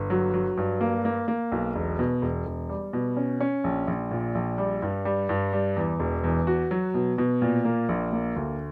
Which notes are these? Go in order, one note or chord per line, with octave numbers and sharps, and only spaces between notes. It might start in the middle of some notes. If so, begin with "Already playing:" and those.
Already playing: G1
F#3
F#3
G2
A#3
A#3
A#3
B1
E1
B2
E1
E1
G3
B2
C#4
C#4
A#1
A#1
A#2
A#1
G3
G2
G3
G2
G3
E2
E1
E2
F#4
F#3
B2
B2
A#2
A#3
A#1
A#3
D2